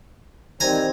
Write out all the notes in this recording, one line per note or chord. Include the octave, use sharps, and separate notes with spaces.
D#3 G3 C4 G#5 A#5